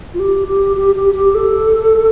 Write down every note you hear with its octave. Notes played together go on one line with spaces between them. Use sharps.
F4
G4
G4
G4
G4
G4
A4